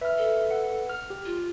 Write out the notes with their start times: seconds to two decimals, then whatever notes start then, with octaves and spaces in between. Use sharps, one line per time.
0.01 B4 E5 F6
0.18 A4
0.51 F#5
0.89 F6
1.10 G4
1.25 F4